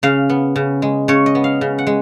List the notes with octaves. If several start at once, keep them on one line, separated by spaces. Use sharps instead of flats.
C#3 F5
B3
C#3
G#3
C#3 C#5
D#5
B3
F5
C#3
F#5
G#3